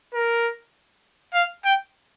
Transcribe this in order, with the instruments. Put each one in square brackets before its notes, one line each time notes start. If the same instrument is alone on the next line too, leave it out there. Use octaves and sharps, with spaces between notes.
[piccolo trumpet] A#4
F5
G5